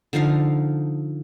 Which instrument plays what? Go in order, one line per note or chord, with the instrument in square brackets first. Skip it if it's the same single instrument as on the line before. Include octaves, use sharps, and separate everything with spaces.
[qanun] D3 F3 D#4 F5